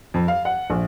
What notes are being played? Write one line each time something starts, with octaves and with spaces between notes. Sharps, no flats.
F2
F5
F#5
A#1